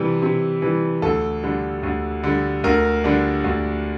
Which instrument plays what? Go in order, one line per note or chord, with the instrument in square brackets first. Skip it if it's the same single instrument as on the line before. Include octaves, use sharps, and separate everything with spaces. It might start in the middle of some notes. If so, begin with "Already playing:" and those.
Already playing: [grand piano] C3 E3 G3
C3
E3 G3
D2 A4
D3 G3
D2
D3 G3
D2 A#4
D3 G3 D4
D2